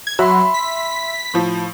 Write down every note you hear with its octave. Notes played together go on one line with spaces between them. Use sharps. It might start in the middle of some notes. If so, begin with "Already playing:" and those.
G#6
F#3 E5 B5 C6
B6
A2 F3